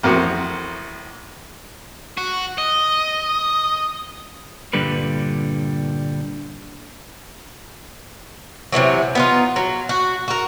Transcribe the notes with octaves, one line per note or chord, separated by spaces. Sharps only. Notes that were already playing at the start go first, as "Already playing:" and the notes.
A1 F2 A2 C4 F#4 A#4
F#4
D#5
G2 A#2 D3 G3 B4
C3 D#3 E3 F#3
B3 D#4 F4
F#3
F#4
F#4 A#4